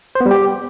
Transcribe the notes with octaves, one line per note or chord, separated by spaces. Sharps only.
C5
B3
G3
G4